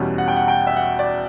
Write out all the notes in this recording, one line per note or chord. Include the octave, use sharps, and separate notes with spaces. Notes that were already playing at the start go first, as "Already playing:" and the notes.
Already playing: E2 B2 G3 C#4
F#5
G5
F#5
G5
E5
F#5
D5